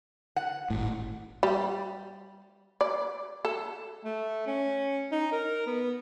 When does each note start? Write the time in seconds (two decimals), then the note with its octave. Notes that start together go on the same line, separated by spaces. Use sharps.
0.36 F#5
0.70 G#1 A2
1.43 G3
2.81 D5
3.45 A4
4.04 A3
4.47 C#4
5.12 D#4
5.32 A#4
5.66 B3